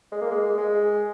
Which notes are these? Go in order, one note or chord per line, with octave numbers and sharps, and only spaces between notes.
G#3
A#3
G#3
G#3